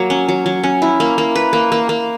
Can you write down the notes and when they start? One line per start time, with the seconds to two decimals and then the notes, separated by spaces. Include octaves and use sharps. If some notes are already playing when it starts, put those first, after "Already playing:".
Already playing: F#3 A#3
0.10 C#4
0.29 F#3
0.46 F#3
0.63 C#4
0.82 E4
1.00 A#3
1.18 A#3
1.36 B4
1.53 A#3
1.72 A#3
1.89 A#3